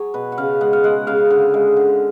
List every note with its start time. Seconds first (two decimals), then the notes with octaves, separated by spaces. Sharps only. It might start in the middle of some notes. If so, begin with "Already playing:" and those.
Already playing: F#3 G#4 C#5
0.14 B2 B4
0.32 F#5
0.38 C#3 F5
0.61 G#3 F#5
0.73 F5
0.84 G#3 F#5
1.07 C#3 F5
1.30 D3
1.54 G#3
1.77 D3